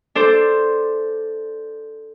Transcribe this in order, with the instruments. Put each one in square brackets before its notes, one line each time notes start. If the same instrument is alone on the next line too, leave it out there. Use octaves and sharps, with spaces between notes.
[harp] D4 A4 C5